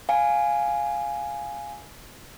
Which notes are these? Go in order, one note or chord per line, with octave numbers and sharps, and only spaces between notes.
F5 G#5